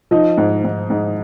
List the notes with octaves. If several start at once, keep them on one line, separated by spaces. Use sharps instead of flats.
F3 D#4 D#5
G#2
G#2
G#2